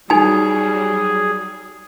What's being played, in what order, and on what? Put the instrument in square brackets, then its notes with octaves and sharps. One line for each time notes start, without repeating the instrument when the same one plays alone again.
[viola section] F#3 G3 [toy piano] D#4 G#5 [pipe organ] G#4